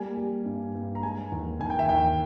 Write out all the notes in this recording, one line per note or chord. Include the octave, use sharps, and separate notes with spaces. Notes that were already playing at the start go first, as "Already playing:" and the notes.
Already playing: G3 A#3 G#5
G3
G2
G2
A#5
G#3 G#5
D#2
D#3 G#5
G5
E5
D#2 G5